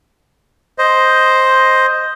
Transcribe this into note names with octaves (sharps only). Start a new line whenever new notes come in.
C5 D#5